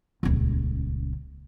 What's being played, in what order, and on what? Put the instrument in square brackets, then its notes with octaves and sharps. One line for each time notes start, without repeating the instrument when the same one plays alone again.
[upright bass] D#1 C#2